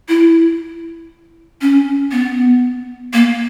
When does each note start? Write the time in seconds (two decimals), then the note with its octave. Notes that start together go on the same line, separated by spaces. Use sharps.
0.09 E4
1.61 C#4
2.12 B3
3.14 A#3